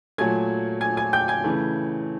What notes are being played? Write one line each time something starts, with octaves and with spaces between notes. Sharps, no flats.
A#2 F#3 A3 G#5 G#6
G#5 G#6
G#5 G#6
G5 G6
G#5 G#6
C#3 E3 A3